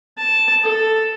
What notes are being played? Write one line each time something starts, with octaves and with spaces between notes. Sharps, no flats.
A5
A4